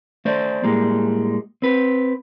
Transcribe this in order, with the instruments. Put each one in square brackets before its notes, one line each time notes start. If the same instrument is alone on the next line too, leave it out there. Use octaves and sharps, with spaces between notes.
[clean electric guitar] A3 C5 D5
A2 G3 G#3 A#3
C4 B4